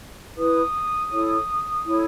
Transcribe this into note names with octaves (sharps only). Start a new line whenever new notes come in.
E4 B4 D#6
E4 A4 C#5
E4 A4 C#5